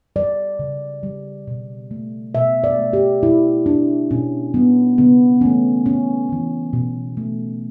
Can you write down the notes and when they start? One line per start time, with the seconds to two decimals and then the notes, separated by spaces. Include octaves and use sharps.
0.16 G3 D5
0.59 C#3
1.03 G3
1.48 B2
1.91 A3
2.35 B2 E5
2.64 D5
2.78 A3
2.93 G4
3.22 B2 E4
3.66 G3 D4
4.11 B2 C#4
4.54 G3 B3
4.98 C#3 B3
5.41 E3 A3 C#4
5.85 C#3 C#4
6.29 E3 A3
6.73 B2
7.17 A3